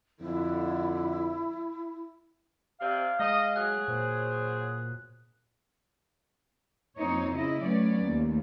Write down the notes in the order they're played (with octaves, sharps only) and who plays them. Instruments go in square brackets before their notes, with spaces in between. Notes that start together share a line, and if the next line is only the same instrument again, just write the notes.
[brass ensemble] F2 D3 [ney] E4
[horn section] C3 D5 [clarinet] F5
[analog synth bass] G#3 [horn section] D#5
[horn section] F#3 G#4 [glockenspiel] F#6
[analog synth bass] A#2 [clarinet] C5
[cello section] F2 A#3 C4 D#4 C#5
C#3 E4 D#5
F#3 A3 B3 C#4 C#5 D5
D#2 A3